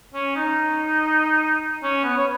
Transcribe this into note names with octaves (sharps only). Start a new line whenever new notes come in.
C#4
D#4
C#4
B3
C#5